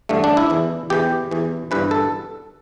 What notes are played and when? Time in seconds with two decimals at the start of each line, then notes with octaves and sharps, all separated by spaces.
0.09 A1 G2 D3 A3
0.24 D4
0.37 E4
0.50 E2 E3
0.90 E2 E3 G4
1.31 E2 E3
1.71 G1 G2 E3 B4
1.91 A4